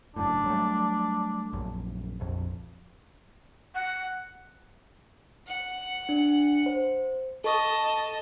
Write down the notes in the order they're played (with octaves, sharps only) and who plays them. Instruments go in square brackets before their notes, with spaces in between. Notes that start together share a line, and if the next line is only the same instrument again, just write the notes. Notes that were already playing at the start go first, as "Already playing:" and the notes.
[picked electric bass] F#1 F#2 A2 [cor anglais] D4
[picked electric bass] F#3 G3 A3
A#1 F#2
A#1 F2
[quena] F#5
[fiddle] F#5
[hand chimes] D4
C5
[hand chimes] A4 C#6 D#6 [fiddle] D#5 A5